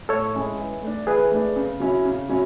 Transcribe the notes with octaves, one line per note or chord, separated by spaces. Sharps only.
A2 A4 C#5
G#3 C#4 E4
E3
A3 D4
E3 G#4 B4
A3 D4
C#3
F#3 C#4 E4
C#3
F#3 C#4 E4